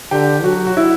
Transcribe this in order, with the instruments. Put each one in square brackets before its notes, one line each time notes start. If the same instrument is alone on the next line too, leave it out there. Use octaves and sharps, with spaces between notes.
[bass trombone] D3 [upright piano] G4
[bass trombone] F#3 [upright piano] F#4
[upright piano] F#4
E4